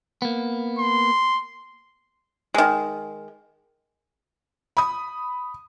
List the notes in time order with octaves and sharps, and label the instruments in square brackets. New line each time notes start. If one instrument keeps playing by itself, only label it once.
[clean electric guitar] A#3 B3
[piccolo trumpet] C6
[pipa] D#3 G#3
[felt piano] B5 D#6